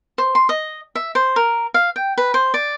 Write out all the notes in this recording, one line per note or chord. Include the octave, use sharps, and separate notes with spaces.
C5
C6
D#5
E5
C5
A#4
F5
G5
B4
C5
D5